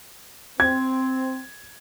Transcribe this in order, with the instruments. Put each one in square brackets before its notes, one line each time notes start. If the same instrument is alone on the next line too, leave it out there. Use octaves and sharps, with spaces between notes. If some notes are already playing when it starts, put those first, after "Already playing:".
[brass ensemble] C4 [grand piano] G#6